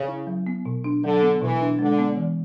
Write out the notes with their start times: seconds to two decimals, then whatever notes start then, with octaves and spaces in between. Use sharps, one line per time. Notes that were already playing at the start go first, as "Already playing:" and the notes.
Already playing: C#3
0.08 E4
0.27 F#3
0.47 B3
0.65 B2
0.84 D4
1.03 D3 F#3
1.22 B3
1.42 B2 E3
1.61 D4
1.79 D3 G#3
1.99 B3
2.17 E3